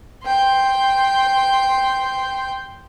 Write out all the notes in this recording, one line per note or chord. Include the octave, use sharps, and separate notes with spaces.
G5 C6